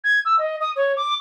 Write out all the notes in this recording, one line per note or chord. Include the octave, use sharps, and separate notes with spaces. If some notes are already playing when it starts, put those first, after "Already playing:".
G#6
E6
D#5
D#6
C#5
D6